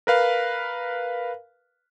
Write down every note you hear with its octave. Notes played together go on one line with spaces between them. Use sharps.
A#4 B4 F5